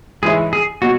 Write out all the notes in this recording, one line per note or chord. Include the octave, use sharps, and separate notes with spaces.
G#2 E3 G#3 E4 G#4 C#5
G#4
B2 F#3 F#4